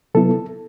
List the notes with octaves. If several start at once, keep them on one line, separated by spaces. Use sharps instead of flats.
C3 F#3 B3 E4 A4